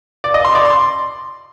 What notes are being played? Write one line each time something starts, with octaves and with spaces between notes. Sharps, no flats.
D5
D#5
C6
D5
C6